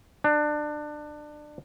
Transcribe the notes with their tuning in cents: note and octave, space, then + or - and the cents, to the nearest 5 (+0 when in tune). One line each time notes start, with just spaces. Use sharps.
D4 +25